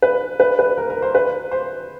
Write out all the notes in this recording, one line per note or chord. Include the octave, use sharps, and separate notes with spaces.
B4
B4
B4
A#4
A#4
C5
B4
C5